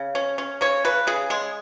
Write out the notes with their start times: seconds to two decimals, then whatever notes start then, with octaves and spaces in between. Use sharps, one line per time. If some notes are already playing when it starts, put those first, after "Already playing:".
Already playing: C#3
0.15 C#4
0.38 C#4
0.61 C#3 C#5
0.85 C#3 B4
1.07 C#3 G#4
1.30 G#3 G#4